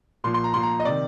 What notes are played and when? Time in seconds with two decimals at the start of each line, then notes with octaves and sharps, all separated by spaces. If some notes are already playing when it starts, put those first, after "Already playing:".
0.24 A#2 F3 C6
0.34 C6
0.44 A#5
0.54 A#2 F3 C6
0.63 A#5
0.80 D#5
0.85 C3 D#3 D5